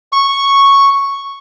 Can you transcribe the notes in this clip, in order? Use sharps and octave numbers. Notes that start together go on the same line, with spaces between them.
C#6